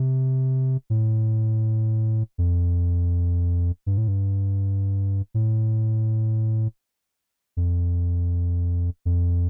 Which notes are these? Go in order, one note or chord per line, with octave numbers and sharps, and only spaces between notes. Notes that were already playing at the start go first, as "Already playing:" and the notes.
Already playing: C3
A2
F2
G2
A2
G2
A2
F2
F2